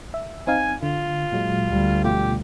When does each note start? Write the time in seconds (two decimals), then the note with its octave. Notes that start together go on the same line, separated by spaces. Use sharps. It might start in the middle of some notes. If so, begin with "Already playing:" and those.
0.14 E5
0.47 C4 D#4 F5 G#5
0.83 D3 F4
1.32 A#2 F#3 G#3
1.67 D2 G3
2.04 B2 A3 F4 G4